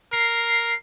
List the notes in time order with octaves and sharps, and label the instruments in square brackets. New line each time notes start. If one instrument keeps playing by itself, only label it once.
[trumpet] A#4 [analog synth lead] C7